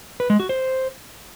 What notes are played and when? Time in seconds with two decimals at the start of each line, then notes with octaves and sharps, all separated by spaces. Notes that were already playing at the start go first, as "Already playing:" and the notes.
0.20 B4
0.30 G#3
0.40 F#4
0.49 C5